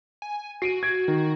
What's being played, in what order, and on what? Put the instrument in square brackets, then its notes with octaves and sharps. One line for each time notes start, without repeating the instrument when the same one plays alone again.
[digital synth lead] G#5
[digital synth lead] F#4 [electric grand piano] C7 D7 D#7
[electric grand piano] G#6 D7
D#3